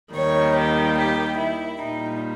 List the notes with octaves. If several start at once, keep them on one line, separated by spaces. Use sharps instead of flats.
D#2 D#3 G3 C#5
G4
G4
E4
A#2 G3 D#4